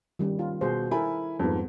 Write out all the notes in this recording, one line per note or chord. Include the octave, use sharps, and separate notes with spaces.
D#3 G3 C#4
F4
B2 G#4 C5
E4 A4 A#4 G#5 B5
F2 G#2 G3 B3